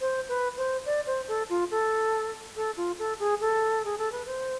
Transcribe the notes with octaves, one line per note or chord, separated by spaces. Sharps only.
C5
B4
C5
D5
C5
A4
F4
A4
A4
F4
A4
G#4
A4
G#4
A4
B4
C5